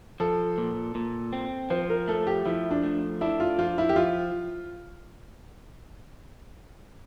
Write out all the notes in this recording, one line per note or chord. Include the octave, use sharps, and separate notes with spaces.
F3 A4
A#2
A#2
C4
F3 C5
A#4
A3 A4
G4
F3 E4
D4
A3
D4 E4
F4
F3 F4
E4
G4
F3 F4